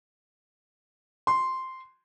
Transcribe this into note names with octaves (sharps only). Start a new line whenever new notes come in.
C6